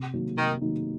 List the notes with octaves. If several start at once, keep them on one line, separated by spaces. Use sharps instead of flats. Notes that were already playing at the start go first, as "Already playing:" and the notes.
Already playing: C3
D#3 F#3 A#3 D#4
C3 D#3
D#3 F#3 A#3 D#4